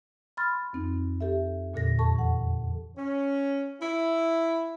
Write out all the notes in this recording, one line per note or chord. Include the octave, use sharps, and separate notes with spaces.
B5 C6 F6 A6
F2 C4 D#4
G4 A4 E5
E2 A#2 D3 A4 A#6
F2 A4 A5 C#6
E3 F#5
C#4
E4